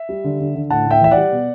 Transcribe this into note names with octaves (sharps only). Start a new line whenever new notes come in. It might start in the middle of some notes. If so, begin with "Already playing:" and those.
Already playing: E5
G3
D3
D3
D3
A2 F#5 A5
A2 E5 G5
E3 E5
D5 F#5
G3
B2